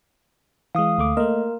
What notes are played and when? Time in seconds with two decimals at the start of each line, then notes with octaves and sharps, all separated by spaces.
0.75 E3 G#3 F5 D#6
0.98 D2 A3 D6
1.17 A3 A#3 A#4 D#5